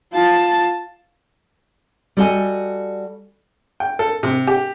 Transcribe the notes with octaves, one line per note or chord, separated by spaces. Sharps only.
F4 A5
G3 F#4 A4 B4 D#5 G#5
G5
A4
C3
G4